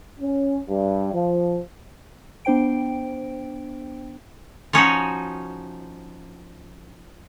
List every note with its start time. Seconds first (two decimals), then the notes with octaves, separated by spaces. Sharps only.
0.20 C#4
0.67 G2
1.13 F3
2.45 B3 D4 C5 G5 D7
4.73 F3 C#4 D#4 F#4